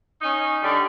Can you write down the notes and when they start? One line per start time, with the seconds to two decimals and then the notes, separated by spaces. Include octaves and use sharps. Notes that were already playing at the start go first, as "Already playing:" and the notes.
0.22 C#4 D#4
0.62 D3 G3